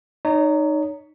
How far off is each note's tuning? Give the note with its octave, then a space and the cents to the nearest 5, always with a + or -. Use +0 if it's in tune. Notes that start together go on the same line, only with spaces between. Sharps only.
D#4 -15 C#5 +30